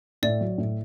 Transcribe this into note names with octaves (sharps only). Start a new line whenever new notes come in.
A2 D5
F#3
A2